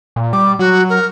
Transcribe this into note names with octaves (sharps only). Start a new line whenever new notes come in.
A#2
G3 D6
F#3 F#4
A#4